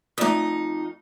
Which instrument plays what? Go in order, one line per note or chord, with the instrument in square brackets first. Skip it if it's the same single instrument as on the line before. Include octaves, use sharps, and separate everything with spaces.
[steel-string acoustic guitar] F2 D#4 [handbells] A3 D5 D#6